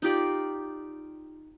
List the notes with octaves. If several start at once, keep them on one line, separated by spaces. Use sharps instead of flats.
D#4 F4 G4 D5